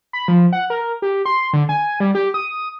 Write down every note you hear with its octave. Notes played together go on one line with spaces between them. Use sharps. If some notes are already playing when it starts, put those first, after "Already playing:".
B5
F3
F#5
A#4
G4
C6
D3
G#5
G3
G4
D#6